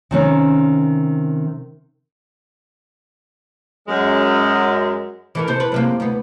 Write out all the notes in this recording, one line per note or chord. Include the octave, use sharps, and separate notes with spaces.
C3 D#3 C#4
F#2 G#3
E3 A4 A#4
C3 A4 C5
B4
F#2 C3 A#3
D2 B3